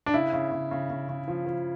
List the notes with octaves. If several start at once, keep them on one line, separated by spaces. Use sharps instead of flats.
D4
C#3 E4
C#3
C#3
C#3
C#3
C#3
F3
F3